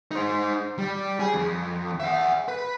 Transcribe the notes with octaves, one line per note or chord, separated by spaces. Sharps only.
D#4 C5
G3
G#4
F2
E5 F#5
B4